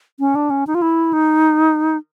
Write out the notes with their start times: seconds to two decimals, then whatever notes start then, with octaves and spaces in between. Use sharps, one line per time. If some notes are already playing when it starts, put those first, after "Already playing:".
0.19 C#4
0.35 D4
0.50 C#4
0.67 D#4
0.75 F4
0.82 E4
1.13 D#4